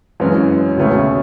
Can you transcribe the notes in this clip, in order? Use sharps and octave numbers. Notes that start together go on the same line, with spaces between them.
F#2 E3 G#3 C#4
C#2 B2 A3 C#4